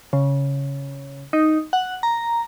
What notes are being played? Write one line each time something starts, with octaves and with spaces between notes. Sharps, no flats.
C#3
D#4
F#5
A#5